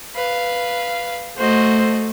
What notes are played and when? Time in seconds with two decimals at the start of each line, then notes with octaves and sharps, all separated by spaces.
0.16 B4 F5
1.38 A3 F#4 C5 D#5